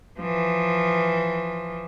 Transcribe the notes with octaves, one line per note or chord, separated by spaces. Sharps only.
E3 F3